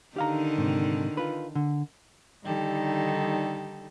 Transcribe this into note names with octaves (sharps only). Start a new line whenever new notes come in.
D3 D#3 D#4 G4 F5 A#5
G#2 C3
F4 B4
D3
D3 D#3 G3 D#4 G4 A4